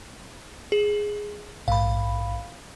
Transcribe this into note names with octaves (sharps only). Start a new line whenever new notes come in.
G#4
A#1 G#2 F5 B5